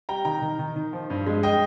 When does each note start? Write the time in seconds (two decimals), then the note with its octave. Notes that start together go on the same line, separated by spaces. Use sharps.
0.09 G3 G5 A#5
0.25 D#3 G5 A#5
0.42 D#3
0.59 D#3
0.76 D#3
0.93 F3
1.10 G2
1.27 G#3
1.43 D#5 G5